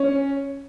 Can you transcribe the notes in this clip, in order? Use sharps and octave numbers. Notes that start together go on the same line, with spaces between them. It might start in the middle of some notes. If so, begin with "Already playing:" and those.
Already playing: C#4